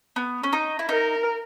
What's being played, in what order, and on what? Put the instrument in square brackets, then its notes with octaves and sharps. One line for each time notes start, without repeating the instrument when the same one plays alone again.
[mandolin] B3
C#4
D#4
E4
[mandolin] D#4 [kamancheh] A#4